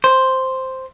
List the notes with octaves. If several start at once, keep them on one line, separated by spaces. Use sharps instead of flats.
C5